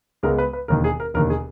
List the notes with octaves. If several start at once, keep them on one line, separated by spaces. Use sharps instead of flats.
C#2 C#3 G#3 B3 A#4
B4
B4
E1 D#2 D#3 A#4
G#4
A#4
E1 D#2 D#3 A#4
G#4